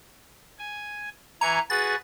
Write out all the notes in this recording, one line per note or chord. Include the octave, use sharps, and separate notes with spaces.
G#5
E3 G#5 A#5 C#6
F#4 G#4 B4 A6